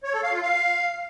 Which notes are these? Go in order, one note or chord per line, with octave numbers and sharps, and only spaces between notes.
C#5
A4
F5
F4
F5